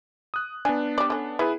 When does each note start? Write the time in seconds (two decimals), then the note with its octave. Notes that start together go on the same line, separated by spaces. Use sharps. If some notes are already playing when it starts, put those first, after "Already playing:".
0.34 D#6 F#6
0.65 B3 D4 G#5
0.98 G3 D5
1.10 D3 C#4
1.39 B3 E4 G#4 B4